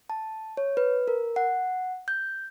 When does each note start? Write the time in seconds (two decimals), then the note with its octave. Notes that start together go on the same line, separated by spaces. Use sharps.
0.10 A5
0.57 C#5
0.77 B4
1.08 A#4
1.36 F#5
2.08 G6